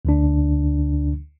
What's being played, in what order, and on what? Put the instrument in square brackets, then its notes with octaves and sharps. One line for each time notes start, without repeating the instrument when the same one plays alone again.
[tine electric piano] D2 D3 D4